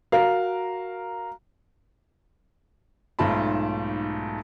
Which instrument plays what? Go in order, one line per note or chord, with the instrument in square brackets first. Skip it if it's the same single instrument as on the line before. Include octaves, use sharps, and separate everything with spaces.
[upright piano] F#4 A#4 F5
B1 G#2 A3 F4 A5 B5